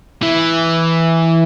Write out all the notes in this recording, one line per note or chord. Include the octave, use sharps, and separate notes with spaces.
E3